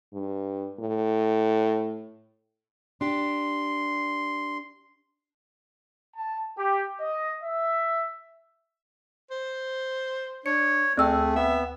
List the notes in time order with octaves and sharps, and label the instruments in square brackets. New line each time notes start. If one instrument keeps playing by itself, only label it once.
[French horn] G2
A2
[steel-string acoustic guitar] D4 G4 [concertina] C6
[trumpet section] A5
G4
D#5
E5
[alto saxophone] C5
[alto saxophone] D4 [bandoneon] C#5 [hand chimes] C#7
[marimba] D2 E6 [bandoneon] A3 [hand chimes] C4 G5 [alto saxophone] G#4
[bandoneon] B3 [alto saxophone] E5